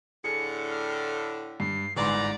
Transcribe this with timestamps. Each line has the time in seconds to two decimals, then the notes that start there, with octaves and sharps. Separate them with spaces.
0.24 A2 D3 G#4 C#7
0.70 F6
1.60 G2 C7
1.97 G1 G#2 E3 D5 A#5 C6